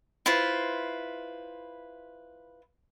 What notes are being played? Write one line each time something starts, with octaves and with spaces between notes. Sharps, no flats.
E4 F4 B4 C5